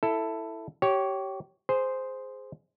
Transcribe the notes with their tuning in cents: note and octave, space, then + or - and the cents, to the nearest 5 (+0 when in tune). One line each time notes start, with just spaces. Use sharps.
E4 +0 A4 +10
G4 -25 C#5 +0
G#4 +0 C5 -5